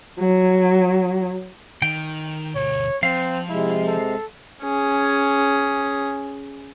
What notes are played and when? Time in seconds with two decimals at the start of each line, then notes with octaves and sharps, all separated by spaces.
0.19 F#3
1.82 D#3 G5
2.55 D2 B2 C#5
3.03 F3 C4 F5
3.49 C3 G#3 E4
3.87 A4
4.63 C#4 G#4